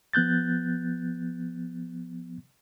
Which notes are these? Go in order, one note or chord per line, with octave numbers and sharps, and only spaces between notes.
F3 B3 F#6 G6 A6